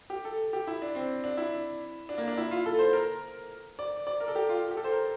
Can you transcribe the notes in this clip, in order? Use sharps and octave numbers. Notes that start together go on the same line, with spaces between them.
G4
A4
G4
E4
D4
C4
D4
E4
D4
A#3
D4
E4
F4
A4
C5
A#4
D5
D5
A#4
A4
G4
F4
G4
A4
C5
A#4